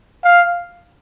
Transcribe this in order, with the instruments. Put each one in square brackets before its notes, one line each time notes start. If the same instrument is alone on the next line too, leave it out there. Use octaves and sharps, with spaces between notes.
[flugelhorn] F5